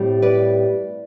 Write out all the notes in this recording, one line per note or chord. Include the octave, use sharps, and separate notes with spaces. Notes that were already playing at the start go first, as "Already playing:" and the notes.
Already playing: A2 G3 C4
B4 D5